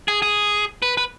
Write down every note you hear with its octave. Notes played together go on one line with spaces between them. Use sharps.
G#4
G#4
B4
B4